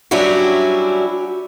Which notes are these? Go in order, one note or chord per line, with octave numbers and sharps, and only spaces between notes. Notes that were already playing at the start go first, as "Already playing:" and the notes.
F#3 G3 C#4 D4 E4 F#4